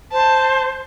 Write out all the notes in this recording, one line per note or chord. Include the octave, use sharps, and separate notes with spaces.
C5 A5